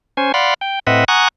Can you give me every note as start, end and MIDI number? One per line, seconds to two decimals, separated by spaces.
0.17 0.32 61
0.17 0.32 72
0.17 0.32 80
0.34 0.54 74
0.34 0.54 77
0.34 0.54 78
0.34 0.54 83
0.34 0.54 84
0.61 0.79 79
0.87 1.04 45
0.87 1.04 60
0.87 1.04 71
0.87 1.04 75
0.87 1.04 76
0.87 1.04 78
1.08 1.28 78
1.08 1.28 80
1.08 1.28 82
1.08 1.28 85
1.08 1.28 87
1.08 1.28 90